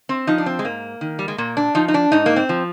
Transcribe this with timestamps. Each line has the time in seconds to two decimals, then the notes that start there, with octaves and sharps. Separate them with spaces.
0.09 C4
0.27 F3 D#4
0.38 D4
0.46 C4
0.59 G#3
0.65 G#2 A#3
1.01 D#3
1.19 G3
1.28 G#3
1.38 A#2 A#3
1.57 D4
1.75 F3 D#4
1.88 D#4
1.94 D4
2.12 G#2 D#4
2.26 A#3
2.36 C4
2.49 F3